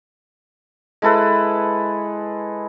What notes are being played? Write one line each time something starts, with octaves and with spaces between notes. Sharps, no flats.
G#3 E4 A4 B4